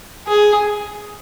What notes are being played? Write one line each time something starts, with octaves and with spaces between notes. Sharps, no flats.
G#4